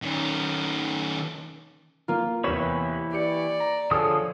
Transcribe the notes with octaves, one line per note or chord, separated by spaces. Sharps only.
D#3 C#4
A#3 F4
E2 C3 E3 B4 C#5 E7
G4 D5 C#7
A#5
D3 F3 G#4 A4 C#5 D#6